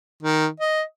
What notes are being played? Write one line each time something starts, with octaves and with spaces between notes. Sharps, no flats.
D#3
D#5